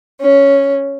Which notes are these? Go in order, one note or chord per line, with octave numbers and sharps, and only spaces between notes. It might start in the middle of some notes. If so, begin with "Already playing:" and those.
C#4